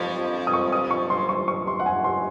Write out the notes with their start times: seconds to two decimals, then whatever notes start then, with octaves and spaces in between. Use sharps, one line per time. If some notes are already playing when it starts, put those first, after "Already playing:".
Already playing: F2 F3 C#6
0.47 D#6
0.53 C#6
0.72 D#6
0.91 C#6
1.10 C6
1.29 C#6
1.48 C#6
1.67 C6
1.80 F#5
1.86 G#5
2.04 C6